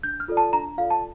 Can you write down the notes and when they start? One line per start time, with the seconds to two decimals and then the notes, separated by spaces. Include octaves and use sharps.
0.03 D4 G6
0.20 F6
0.28 F4 A4 D5
0.37 A5
0.53 D4 A#5
0.78 F4 A4 D5 F5
0.90 A5